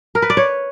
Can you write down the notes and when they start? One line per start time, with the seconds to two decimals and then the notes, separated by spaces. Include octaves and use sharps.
0.15 A#4
0.22 B4
0.30 D5
0.37 C#5